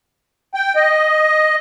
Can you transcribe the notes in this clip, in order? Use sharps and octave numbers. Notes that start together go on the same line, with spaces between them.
G5
D#5